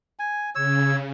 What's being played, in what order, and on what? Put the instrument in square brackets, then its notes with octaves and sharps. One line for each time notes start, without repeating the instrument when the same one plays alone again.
[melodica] G#5
[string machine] C#3 [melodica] C#5 E6